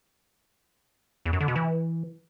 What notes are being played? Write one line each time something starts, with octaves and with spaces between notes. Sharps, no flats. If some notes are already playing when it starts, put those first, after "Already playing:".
E2
F#2
D3
B2
E3